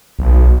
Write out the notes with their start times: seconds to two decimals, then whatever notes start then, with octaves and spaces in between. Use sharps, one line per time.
0.19 B1